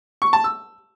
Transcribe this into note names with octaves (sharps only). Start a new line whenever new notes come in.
C#6
A5
E6